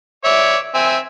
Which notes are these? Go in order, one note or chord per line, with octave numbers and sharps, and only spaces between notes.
C#5 D5 E5
C4 E5 G#5